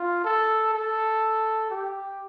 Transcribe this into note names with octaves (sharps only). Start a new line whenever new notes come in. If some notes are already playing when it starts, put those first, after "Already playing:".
Already playing: F4
A4
A4
G4